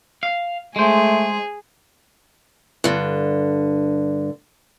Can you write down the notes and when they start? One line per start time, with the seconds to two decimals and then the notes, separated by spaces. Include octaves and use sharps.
0.23 F5
0.76 G#3 A3 G#4 C5
2.84 G2 D3